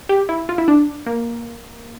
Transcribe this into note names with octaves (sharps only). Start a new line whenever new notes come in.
G4
E4
F4
E4
D4
A#3